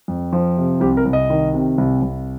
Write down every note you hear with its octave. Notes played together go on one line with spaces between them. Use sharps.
F2
F3
C3
C2 G4
A#4
C2
D#5
D#3
C3
C2
C2